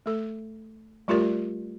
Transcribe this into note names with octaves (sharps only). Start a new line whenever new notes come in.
A3 A4
G3 A3 F4 G4 A#4 D5